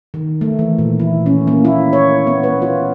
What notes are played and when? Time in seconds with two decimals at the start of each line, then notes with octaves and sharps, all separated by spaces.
0.14 D#3
0.41 A3
0.59 E3
0.78 A#2
1.00 E4
1.26 C#4
1.47 A#3
1.65 E4
1.93 C#5
2.27 B3
2.43 B4
2.62 F4